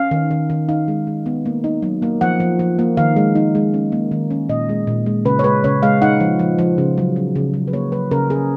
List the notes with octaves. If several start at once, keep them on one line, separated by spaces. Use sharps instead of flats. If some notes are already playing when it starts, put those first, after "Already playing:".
Already playing: C#4 F5
D#3
D#3
D#3
D#4 F5
G#3
G#3
B3
A#3
D#4
F#3
A#3
F3 F#5
F3
F3
A#3
D#3 F5
G#3
D#4
G#3
C#4
A#3
D#3
C#4
A#2 D#5
G#3
A#2
G#3
C#3 B4
C#5
G#3 B4
C#3 C#5
G#3 F5
D#4 F#5
F3
F3
F3
C#3
F#3
F#3
C#3
F#3
B4
A#3 C#5
F#3 B4
C#3 A#4
C#4 G#4